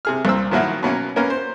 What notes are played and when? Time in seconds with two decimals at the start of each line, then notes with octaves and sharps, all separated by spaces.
0.05 C3 G#4 F6
0.25 C2 A#2 C4 E6
0.51 D#3 F3 F#3 A#3 E4 F#4
0.83 B2 F#3 A#3 C#4
1.16 A#3 B3 C#4 A#4
1.30 C5